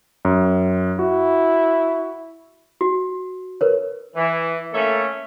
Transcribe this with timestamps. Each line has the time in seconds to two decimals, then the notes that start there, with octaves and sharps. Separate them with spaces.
0.25 F#2
0.99 E4 F#4
2.81 F#4
3.61 A#4 B4 C#5
4.15 E3
4.73 A3 A#3 C#4 A4 C#5 E5